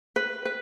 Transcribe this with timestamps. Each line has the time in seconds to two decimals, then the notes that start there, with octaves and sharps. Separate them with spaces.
0.16 B4
0.45 B4